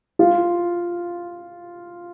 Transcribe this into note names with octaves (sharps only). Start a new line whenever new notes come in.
F4